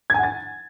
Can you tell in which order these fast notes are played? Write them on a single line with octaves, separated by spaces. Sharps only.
G#6 G#5 F#5 A6